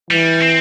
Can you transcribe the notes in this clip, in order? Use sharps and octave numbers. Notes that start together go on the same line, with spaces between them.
E3 G3
C4